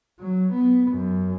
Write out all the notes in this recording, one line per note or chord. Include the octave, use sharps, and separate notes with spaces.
F#3
B3
F#2